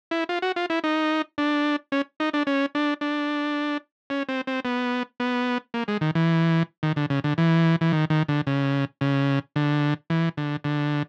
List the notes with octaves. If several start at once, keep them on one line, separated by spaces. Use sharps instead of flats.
E4
F4
F#4
F4
E4
D#4
D4
C#4
D#4
D4
C#4
D4
D4
C#4
C4
C4
B3
B3
A#3
G#3
D#3
E3
D#3
D3
C#3
D3
E3
E3
D#3
D#3
D3
C#3
C#3
D3
E3
D3
D3